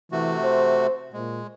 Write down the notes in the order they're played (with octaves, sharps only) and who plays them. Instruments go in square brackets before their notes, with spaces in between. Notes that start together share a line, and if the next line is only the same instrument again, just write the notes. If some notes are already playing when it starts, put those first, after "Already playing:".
[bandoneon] C3 A3 F#4 [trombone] E3
[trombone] C5
[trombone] A#2 [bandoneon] G#3